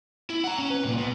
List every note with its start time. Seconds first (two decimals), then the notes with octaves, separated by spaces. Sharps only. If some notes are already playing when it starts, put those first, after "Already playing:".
0.30 E4
0.44 F#5 A#5
0.59 C#4
0.70 B4
0.84 C2 A#2
0.98 B2